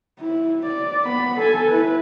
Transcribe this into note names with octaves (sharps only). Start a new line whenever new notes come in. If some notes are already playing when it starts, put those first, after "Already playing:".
E4
D5
B3 B5
A4 G#5
E4 B4